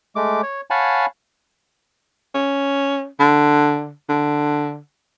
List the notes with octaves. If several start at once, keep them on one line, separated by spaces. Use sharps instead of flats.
G#3 A3 D6
C#5
C#5 F5 F#5 G#5 A5 B5
C#4
D3
D3